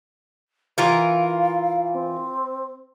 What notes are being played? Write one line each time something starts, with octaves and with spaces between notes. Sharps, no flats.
E3 F4 A#4 F5
C4